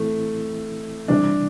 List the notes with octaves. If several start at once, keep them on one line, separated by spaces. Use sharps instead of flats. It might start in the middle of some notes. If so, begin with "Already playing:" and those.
Already playing: A2 E3 A3 C4 E4
C3 E3 G3 D4